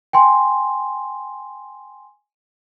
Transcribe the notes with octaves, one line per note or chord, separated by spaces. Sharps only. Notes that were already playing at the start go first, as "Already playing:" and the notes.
G5 G#5 C6